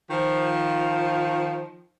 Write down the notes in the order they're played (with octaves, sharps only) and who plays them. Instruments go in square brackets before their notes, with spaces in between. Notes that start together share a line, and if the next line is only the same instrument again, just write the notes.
[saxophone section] D#3 F3